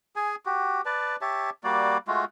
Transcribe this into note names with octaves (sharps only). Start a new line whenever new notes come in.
G#4 G#5
F#4 G4
B4 D5 A5
G4 C#5 E5 A5
G3 A#3 F#4 D5
G#3 A3 F4 F#4